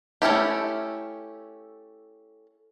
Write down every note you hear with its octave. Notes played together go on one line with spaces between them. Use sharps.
A3 C#4 E4 G4